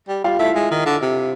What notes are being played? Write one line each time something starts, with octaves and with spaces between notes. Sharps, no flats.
G3
G3 F4 F5
A3 E4 E5
G#3
D#3
D3
C3